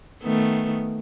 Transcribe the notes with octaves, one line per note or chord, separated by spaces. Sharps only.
D#3 A3 B3